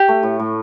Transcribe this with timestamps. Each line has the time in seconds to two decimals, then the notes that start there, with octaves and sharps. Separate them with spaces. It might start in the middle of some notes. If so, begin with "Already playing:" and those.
Already playing: G4
0.08 A3
0.23 A2
0.39 A2